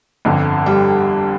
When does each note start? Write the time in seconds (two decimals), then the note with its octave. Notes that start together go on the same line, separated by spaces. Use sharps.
0.25 G1 F2 D3
0.66 G3